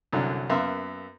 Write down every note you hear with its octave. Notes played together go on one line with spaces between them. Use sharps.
C2 F#2 D3 F#3
F#2 A#3 B3 E5 F5 C6